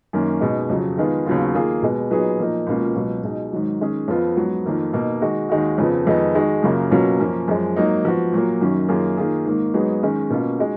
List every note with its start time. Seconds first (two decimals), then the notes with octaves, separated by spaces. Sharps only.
0.13 F#2 D#3 A#3 C#4
0.41 B2 G#3 D#4
0.69 F2 C#3 F#3
0.97 D#3 G#3 B3 F4 G#4
1.26 D#2 C#3 F#3 B3 F4
1.54 D#3 A#3 F4 G#4
1.82 B2 G#3 B3
2.11 A#2 F#3 B3 D#4 G#4
2.39 A#2 F3 A#3 D#4
2.67 C#2 B2 A#3 C#4 F4
2.95 C#2 B2 F#3
3.24 B2 G#3 D#4
3.52 G#2 D#3 F#3
3.81 D#3 G#3 C#4 G#4
4.08 F2 F3 B3 F4
4.37 G#2 F#3 B3
4.66 F2 D#3 A#3
4.93 B2 A#3 D#4
5.22 D#3 G#3 D#4 F#4
5.49 D#2 D#3 G#3 D#4 F#4
5.78 F2 C#3 F3 B3
6.07 F2 D#3 G#3 B3 D#4
6.35 D#3 G#3 D#4 F#4
6.63 F#2 C#3 F#3 A#3 F4
6.91 B2 F#3 A#3 C#4 F4
7.20 F#2 F3 A#3 C#4
7.48 F#2 F3 G#3
7.76 G#2 F#3 A#3 D#4
8.04 G#2 F3 B3 F#4
8.33 A#2 F#3 A#3
8.61 F#2 D#3 F#3 C#4
8.88 F#2 D#3 A#3 F4 G#4
9.17 D#3 A#3 F4 G#4
9.45 G#2 D#3 A#3
9.74 G#2 F#3 B3 D#4 G#4
10.02 G#2 D#3 G#3 C#4
10.30 B2 A#3 C#4 F4
10.59 G#3 D#4 F#4